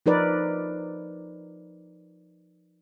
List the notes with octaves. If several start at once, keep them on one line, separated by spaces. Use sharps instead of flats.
F3 D#4 A#4 B4 D5